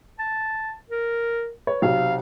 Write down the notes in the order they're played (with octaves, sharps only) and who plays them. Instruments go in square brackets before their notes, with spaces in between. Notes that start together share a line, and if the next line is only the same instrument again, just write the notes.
[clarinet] A5
A#4
[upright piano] B4 C#5
[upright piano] B1 C3 [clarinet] F5